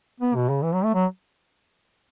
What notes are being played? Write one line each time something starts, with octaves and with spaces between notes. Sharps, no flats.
B3
B2
C#3
E3
F#3
A3
F#3